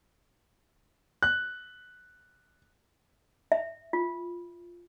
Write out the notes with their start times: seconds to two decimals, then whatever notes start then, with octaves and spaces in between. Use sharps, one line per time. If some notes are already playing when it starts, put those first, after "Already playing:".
1.23 F#6
3.52 E5
3.93 F4